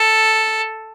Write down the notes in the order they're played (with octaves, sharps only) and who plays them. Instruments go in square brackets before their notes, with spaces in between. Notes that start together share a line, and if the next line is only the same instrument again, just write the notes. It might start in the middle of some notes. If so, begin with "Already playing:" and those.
Already playing: [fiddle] A4